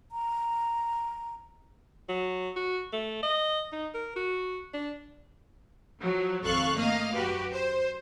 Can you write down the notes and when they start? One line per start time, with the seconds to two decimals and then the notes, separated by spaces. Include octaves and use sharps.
0.12 A#5
2.09 F#3
2.56 F#4
2.93 A3
3.23 D#5
3.72 D#4
3.94 A#4
4.16 F#4
4.74 D4
6.02 F3 F#3
6.44 G#1 F2 A4 F5 C#6 F#6
6.76 A3 A#3 D#5 F5
7.14 F#2 F#4 G4 B4
7.55 C5